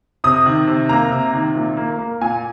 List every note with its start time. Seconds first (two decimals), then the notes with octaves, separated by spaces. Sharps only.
0.24 C3 D#6
0.46 D#3
0.67 C3
0.89 A#3 A#5
1.11 C3
1.33 D#3
1.55 A#2
1.77 A#3
1.99 A#3
2.21 A#2 G#5